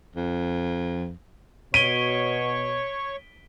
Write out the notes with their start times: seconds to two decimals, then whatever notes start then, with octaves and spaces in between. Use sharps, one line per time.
0.16 F2
1.74 B2 C#5 C#6 B6 D7 D#7 G7